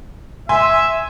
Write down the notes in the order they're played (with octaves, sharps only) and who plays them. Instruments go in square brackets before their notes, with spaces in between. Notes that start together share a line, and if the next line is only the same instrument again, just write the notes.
[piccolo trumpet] E5 [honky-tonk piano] G#5 C6